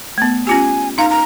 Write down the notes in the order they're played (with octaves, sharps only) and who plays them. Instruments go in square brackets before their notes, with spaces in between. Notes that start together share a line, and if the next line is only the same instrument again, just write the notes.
[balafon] A3 B3
[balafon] C#4 F4 G4 [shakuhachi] G#5
[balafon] D#4 F5 [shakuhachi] A#5
[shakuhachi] A#5